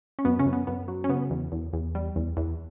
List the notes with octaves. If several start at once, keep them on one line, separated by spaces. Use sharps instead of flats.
C#4
F#2 B3
C#3 C#4
F#2
B3
F#2 B3
F#3
C#4
C#3 B3
E2
E2
E2
G3
E2
E2